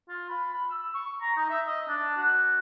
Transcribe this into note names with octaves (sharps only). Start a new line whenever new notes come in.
F4
B5
B5
E6
C#6
A#5
D#4
E5
D#5
D4
F#4